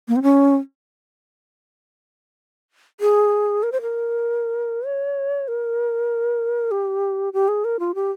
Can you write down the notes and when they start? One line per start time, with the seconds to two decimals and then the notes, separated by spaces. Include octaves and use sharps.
0.08 A#3
0.16 C4
0.23 C#4
3.00 G#4
3.63 A#4
3.72 C5
3.82 A#4
4.86 C#5
5.48 A#4
6.71 G4
7.33 G4
7.48 G#4
7.64 A#4
7.80 F4
7.95 G4